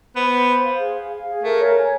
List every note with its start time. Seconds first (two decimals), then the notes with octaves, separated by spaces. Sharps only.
0.16 B3 C5
0.31 C5
0.48 C5
0.63 F5
0.80 G#4
0.96 F5
1.11 F5
1.27 G#4
1.43 A3 A#4
1.59 C#5
1.76 G#5